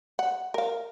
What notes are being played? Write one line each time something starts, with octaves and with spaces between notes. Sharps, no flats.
F#5
A#4 F5